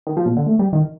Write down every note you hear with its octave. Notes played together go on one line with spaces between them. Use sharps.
D#3
F3
A#2
D3
A3
G3
D#3